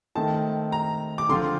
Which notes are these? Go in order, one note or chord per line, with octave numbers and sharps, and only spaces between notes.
D#3 A3 C4 A5
A#5
D6
D3 F3 C4 F4 C6